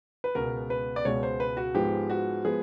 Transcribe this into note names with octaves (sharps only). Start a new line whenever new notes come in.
B4
C#2 B2 G#3 B3 A#4
B4
D5
C#2 B2 G#3 B3 C#5
C5
B4
F#4
G#2 F3 G#3 B3 G4
F#4
F3 G#3 B3 G#4